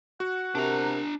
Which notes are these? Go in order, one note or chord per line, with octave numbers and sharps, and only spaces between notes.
F#4 F#5
C3 D4 A#4 A#5